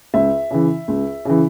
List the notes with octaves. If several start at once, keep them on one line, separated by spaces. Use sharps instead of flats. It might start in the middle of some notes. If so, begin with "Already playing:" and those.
C#2 E5
C#3 E3
C#2
C#3 E3